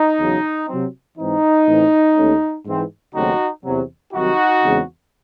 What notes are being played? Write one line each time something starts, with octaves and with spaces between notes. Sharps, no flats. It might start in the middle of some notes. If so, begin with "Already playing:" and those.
Already playing: D#4
E2 C#3 F#3
C3 F#3 C4
G#2 E3 C4 D#4
A2 E3 C4
D#2 D#3 A3 C#4
G#2 E3 C4
D#2 C#3 F#3 A3 C4 D#4 F#4
E2 C3 F#3
C2 C3 D#3 F#3 D#4 F#4
E2 C#3 G#3 C4